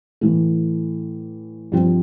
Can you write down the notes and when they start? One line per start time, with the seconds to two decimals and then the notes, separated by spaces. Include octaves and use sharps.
0.21 A2 E3 A3
1.72 G2 F3 C4